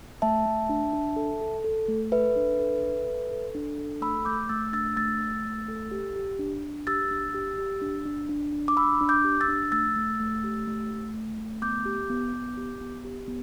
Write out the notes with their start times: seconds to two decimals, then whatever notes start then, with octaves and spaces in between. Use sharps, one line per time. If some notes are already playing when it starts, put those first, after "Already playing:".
0.22 A3 E5 A5
0.46 A3
0.69 D4
0.93 D4
1.16 A4
1.41 A4
1.64 A4
1.88 A3
2.12 A4 B4 E5
2.36 D4
2.59 A4
2.83 A4
3.07 A4
3.31 A4
3.55 D4
3.78 A4
4.01 A3 B5 E6
4.25 A3 D6 G6
4.49 A3 E6 A6
4.73 D4 E6 A6
4.97 A3 E6 A6
5.21 A3
5.45 A3
5.68 A4
5.91 G4
6.16 G4
6.39 D4
6.63 D4
6.87 G4 E6 A6
7.11 D4
7.34 G4
7.58 G4
7.82 D4
8.05 D4
8.29 D4
8.53 D4
8.68 D6
8.77 D4 B5 E6
9.01 D4
9.09 D6 G6
9.24 G4
9.41 E6 A6
9.48 D4
9.72 A3 E6 A6
9.96 A3
10.20 A3
10.44 G4
10.67 A3
10.91 A3
11.14 A3
11.38 A3
11.62 B3 D6 G6
11.86 G4
12.10 B3
12.33 B3
12.57 G4
12.81 B3
13.05 G4
13.28 B3